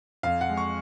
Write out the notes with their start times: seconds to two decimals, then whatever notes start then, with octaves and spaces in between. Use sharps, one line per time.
0.23 F2 F5
0.41 F#5
0.49 G#3
0.57 C#6